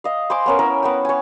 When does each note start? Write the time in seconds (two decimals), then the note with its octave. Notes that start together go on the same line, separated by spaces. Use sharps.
0.04 D#5 F5
0.30 C5 G#5 C6 D6
0.46 B3 C#4 A#4
0.59 E4 A#4 E6
0.83 B3 F#5 G5
1.05 C#5 G#5